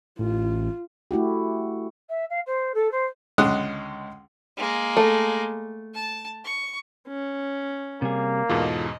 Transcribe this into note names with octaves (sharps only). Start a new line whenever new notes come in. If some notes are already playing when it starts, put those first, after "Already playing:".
A1 F4
A3 E4 F#4 G4
E5
F5
C5
A4
C5
C#2 D3 G#3 C#4 D#6 F#6
G#3 A#3
A3
A5
C#6
C#4
C3 G3 A#3 G#4
E2 G#2 B2 F4 A4 D#5